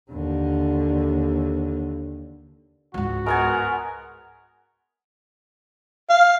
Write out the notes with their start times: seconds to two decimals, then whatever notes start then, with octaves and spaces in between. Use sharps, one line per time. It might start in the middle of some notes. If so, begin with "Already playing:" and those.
0.11 D#2 D3
2.94 C#2 G#2 F#4
3.26 G#3 B3 A#4 G#5
6.09 F5